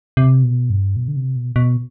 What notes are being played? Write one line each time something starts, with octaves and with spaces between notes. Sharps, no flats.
C3
B2
G2
B2
D3
C3
B2
B2